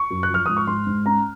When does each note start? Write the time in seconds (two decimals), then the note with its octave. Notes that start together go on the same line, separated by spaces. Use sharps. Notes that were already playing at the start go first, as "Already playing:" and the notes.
Already playing: C#6
0.11 F#2
0.23 F#6
0.29 F3 F6
0.46 G#2 D#6
0.57 C#6
0.67 G#2 C6
0.87 G#2
1.06 C#4 A#5